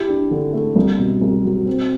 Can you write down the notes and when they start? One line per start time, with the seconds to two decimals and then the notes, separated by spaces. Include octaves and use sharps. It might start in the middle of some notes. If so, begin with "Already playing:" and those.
Already playing: E4 G4
0.08 D4
0.31 D3
0.53 A3
0.76 C2
0.99 B2
1.21 C2
1.44 F#3
1.66 C4